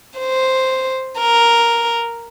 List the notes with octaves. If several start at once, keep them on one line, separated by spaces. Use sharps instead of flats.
C5
A#4